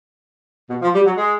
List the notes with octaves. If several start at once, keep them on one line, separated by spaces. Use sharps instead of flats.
B2
F3
G3
F#3
G#3